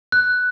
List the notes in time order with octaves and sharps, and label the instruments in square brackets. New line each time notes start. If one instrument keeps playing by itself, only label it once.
[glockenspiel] F#6